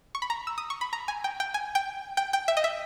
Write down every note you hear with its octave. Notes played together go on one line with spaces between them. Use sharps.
C#6
B5
A#5
E6
D#6
C#6
B5
A#5
G#5
G5
G5
G#5
G5
G5
G5
E5
D#5
E5